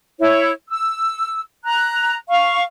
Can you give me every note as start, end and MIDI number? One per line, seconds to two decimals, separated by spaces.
0.20 0.50 64
0.20 0.50 73
0.69 1.41 88
1.65 2.16 82
1.65 2.16 90
2.29 2.63 77
2.29 2.63 85